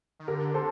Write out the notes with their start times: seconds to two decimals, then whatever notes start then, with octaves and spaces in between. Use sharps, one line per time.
0.20 D#3
0.28 D3 G4 A#4
0.54 A4 C5